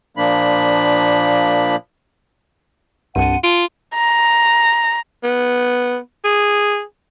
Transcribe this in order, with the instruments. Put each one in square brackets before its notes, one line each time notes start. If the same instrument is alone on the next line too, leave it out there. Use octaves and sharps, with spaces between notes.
[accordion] A#2 F3 A#3 D4 B5
[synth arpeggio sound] C2 G2 D#7 [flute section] F#5 A5 C6
[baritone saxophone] F4 [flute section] A5 [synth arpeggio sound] D7
[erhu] A#5
[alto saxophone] B3
G#4